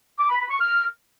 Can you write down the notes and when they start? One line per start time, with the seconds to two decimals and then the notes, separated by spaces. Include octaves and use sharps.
0.20 D6
0.30 B5
0.40 B5
0.51 C#6
0.61 F6